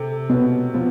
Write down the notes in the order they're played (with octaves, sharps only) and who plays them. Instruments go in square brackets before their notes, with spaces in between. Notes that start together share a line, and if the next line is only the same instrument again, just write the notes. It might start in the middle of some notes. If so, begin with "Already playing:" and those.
Already playing: [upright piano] C3 [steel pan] A4
[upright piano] B2 [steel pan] B3
[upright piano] F3 [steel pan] B3